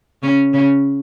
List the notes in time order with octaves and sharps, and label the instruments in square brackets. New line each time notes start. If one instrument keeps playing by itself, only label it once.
[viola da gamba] C#3 C#4
C#3 C#4